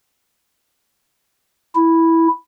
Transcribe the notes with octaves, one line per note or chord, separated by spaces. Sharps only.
E4